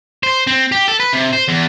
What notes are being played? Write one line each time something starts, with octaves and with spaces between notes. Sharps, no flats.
C5
C4
G4
A4
B4
C3
C5
E2